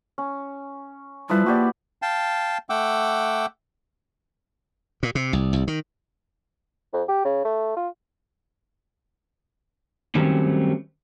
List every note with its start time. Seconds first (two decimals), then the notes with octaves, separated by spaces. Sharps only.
0.18 C#4
1.30 F3 G3 E4 B4
1.46 A#3 F#4 G4 D5
2.02 F5 G5 A5
2.70 A3 F#5 G5 D6 E6
5.03 A#2
5.15 C3
5.33 C2
5.53 C2
5.68 D#3
6.93 F2
7.08 G4
7.25 C#3
7.45 A3
7.77 F4
10.15 D#3 F#3 G3 A3 C4 C#4